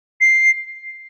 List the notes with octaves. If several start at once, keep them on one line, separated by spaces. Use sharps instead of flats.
C7